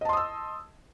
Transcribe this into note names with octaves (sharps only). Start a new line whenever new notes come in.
D#5 A5 C6 D#6 E6